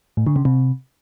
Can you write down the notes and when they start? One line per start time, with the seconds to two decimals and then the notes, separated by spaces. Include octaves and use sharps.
0.17 A2
0.27 D3
0.36 C#3
0.45 C3